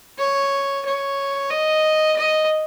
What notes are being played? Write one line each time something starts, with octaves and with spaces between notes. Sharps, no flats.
C#5
C#5
D#5
D#5